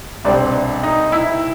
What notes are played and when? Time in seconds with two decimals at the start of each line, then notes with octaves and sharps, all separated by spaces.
0.25 C2 B2 G3 C4 D4 D5
0.83 D#4 D#5
1.12 E4 E5